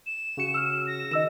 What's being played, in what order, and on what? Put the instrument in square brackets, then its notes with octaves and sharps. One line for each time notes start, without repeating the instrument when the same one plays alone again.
[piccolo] E7
[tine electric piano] C#3 F#4 C#7
[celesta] E6 F6
[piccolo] A#6
[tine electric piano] D#3 [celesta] D#5 E6 E7